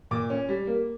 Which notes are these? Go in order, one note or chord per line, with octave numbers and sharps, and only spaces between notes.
A#2 D6
C#4
G3
A#3